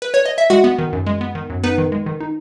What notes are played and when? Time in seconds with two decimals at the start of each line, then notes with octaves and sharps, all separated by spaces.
0.02 B4
0.14 C#5
0.26 D#5
0.38 E5
0.50 G#3 F#4 F#5
0.64 B3
0.78 D#3
0.93 F#2
1.07 G#3
1.21 B3
1.35 D#3
1.50 F#2
1.64 B3 D#4 B4
1.78 D#3
1.92 G#3
2.06 D#3
2.20 D#4